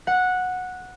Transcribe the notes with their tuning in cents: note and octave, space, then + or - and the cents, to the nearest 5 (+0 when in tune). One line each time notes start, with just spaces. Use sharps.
F#5 -10